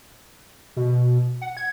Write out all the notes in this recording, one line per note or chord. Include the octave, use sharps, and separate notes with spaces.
B2
F#5
G#6